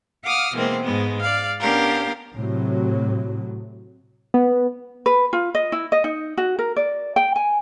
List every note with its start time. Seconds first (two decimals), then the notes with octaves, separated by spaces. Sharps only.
0.23 F5 F#5 D6 D#6 F6
0.54 B2 E3 G#3 A#3 C4
0.83 G#2 G#3 B3
1.23 D5 F5
1.60 B3 C#4 D4 G4 A#4 F5
2.35 A2 C3 F#3
4.34 B3
5.06 B4
5.33 F4
5.55 D#5
5.72 E4
5.92 D#5
6.04 D#4
6.37 F#4
6.59 A#4
6.76 D5
7.16 G5
7.36 G#5